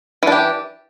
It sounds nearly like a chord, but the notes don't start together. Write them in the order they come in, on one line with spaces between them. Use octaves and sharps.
E3 D4 G4